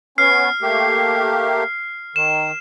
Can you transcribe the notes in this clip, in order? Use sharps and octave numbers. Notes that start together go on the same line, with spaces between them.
B3 C#4 F6 C7
A3 A#3 G4
D#3 E7